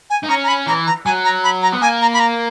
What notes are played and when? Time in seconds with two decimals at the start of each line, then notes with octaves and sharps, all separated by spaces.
0.10 G#5
0.24 D#4
0.29 C#4 A#5
0.44 A#5
0.48 B5
0.67 E3 A#5
0.87 A#5
1.05 F#3 G#5
1.24 A#5
1.44 B5
1.62 A#5
1.73 B3
1.81 A#3 G#5
2.01 A#5
2.14 B5
2.20 A#5